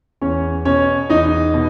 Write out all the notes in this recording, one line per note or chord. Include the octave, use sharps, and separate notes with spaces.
E2 C#4 C#5
B2 C#4 C#5
E2 D#4 D#5
B2